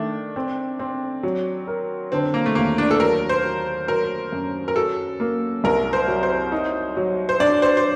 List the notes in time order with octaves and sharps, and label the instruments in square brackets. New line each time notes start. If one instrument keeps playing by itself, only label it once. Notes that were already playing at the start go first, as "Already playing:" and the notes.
Already playing: [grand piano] D#3 A3 [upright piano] D4
[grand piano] C4
C4
F#3
A#4
[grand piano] D3 [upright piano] C4
[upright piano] A#3
A3
[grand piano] D#2 [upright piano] A#3
[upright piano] D4
A4
[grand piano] F#3 [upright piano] A#4
[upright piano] C5
[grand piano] F#3
[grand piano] F#3 [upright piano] A#4
[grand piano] F#2
[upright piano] A#4
[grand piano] F#4 [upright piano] A4
[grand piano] A#3
[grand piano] C2 [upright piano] A#4
[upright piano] C5
[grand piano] F#3
[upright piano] C5
[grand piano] D#4
F#3
[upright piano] C5
[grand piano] D4 [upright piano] D5
[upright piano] C5
C5